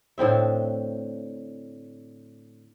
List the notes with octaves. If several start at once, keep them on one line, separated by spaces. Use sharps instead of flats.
A2 D3 C4 E5